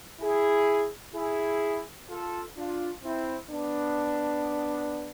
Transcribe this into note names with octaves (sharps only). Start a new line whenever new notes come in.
E4 G#4
E4 G#4
F4 A4
D4 F4
C4 E4
B3 D4